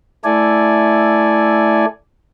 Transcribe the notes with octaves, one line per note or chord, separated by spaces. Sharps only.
A3 E4 A4 D5 G#5